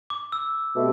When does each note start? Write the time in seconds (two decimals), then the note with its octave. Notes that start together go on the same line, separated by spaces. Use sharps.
0.10 D6
0.32 E6
0.75 B2 A3 C4 G4